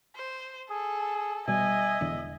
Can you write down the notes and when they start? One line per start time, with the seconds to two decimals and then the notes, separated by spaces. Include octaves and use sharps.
0.16 C5
0.70 G#4 A4
1.48 B2 G3 D#5 E5 G#5
2.01 E1 E2 D3